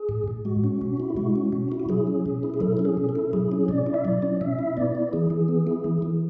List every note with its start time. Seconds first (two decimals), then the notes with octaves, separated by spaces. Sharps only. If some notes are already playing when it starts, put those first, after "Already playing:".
Already playing: G#4
0.09 A2
0.28 A2
0.45 G#3 F#4
0.64 C#4
0.82 B2
1.00 E4
1.17 G#3 F#4
1.35 C#4
1.52 B2
1.72 E4
1.80 F#4
1.89 F#3 G#4
2.07 C#4
2.26 B2
2.43 E4
2.54 G#4
2.60 F#3 A4
2.77 C#4 A4
2.85 G#4
2.97 B2
3.09 A4
3.15 E4
3.33 F#3 G#4
3.52 C#4
3.68 B2 D5
3.86 E4
3.94 E5
4.05 F#3 D5
4.22 C#4
4.41 B2 E5
4.59 E4
4.77 B3 D5
4.95 E4
5.13 E3 G#4
5.30 E3
5.48 B3
5.67 E4
5.84 E3
6.02 E3